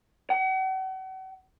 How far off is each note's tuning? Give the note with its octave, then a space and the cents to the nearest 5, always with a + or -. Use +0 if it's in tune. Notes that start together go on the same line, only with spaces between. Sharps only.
F#5 +40